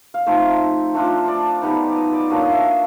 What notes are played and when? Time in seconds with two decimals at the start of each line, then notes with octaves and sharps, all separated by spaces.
0.14 F5
0.27 F3 A3 C4 D#4 E5
0.94 A3 D4 F4
1.28 D5
1.62 G3 B3 D#4
1.90 D5
1.96 D#5
2.13 D5
2.30 F#3 A#3 D4 F4 D#5
2.41 D#5
2.52 E5